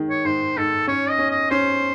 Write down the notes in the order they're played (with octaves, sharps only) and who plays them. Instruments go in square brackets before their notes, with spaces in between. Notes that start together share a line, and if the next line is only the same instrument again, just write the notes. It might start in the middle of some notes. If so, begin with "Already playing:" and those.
Already playing: [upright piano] D#3 G#3
[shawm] C#5
[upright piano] G#2 [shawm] C5
[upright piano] G#2 [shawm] A4
[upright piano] C#4 [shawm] C#5
[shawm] D#5
[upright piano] C#4
[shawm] D#5
[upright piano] C#4 [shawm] C5